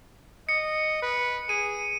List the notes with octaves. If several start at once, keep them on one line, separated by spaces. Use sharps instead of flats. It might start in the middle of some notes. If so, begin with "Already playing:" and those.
D#5 C#7
B4
G#4 D#7